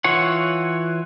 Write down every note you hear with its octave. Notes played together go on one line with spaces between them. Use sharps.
E3 F4 C#5 F#5